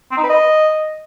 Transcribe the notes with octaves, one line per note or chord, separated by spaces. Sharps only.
C4
D#4
B4
D#5